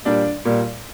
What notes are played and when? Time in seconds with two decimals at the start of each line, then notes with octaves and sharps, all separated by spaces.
0.05 A#2 G3 D4 D5
0.45 A#2 G3